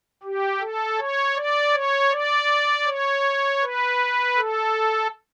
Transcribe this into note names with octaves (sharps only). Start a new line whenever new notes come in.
G4
A4
C#5
D5
C#5
D5
C#5
B4
A4